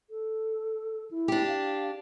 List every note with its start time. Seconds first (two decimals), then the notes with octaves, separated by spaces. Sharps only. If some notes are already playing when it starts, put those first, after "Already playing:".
0.10 A4
1.11 E4
1.28 D4 G4
1.48 F5